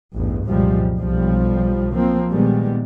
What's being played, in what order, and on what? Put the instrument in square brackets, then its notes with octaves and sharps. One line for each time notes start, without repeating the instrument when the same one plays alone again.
[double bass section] A1 E2 G2
C2 F#2 A#2 F3 G3 G#3
B1 F3 G3
F3 A#3 C4
A#2 D#3 G3 G#3 B3